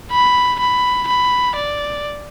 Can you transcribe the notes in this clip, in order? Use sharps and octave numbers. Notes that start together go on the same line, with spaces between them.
B5
B5
B5
D5